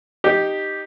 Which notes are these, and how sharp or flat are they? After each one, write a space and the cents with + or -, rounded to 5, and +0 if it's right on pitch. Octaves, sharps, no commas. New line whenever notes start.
D#4 -10 G4 +0